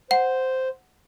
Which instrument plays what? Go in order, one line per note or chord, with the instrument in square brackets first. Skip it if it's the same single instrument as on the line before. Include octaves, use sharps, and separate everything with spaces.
[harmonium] C5 [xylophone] F#5